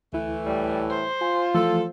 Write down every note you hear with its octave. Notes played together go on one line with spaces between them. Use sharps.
D2 E3 A3 E4
A2 G3
C5
F4 G#5
E3 F3 A3 A4